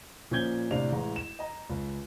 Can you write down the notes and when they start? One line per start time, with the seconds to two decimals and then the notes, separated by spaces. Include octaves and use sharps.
0.31 A#2 F3 C#4 G6 G#6 G7
0.71 A2 C3 D4 F5 F7
0.92 A1 G#3 A#5
1.16 E7
1.39 D#5 A#5
1.70 C#2